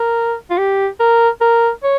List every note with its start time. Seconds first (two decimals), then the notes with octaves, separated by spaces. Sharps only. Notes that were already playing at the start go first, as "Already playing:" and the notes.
Already playing: A#4
0.51 F4
0.58 G4
1.00 A#4
1.41 A#4
1.83 C#5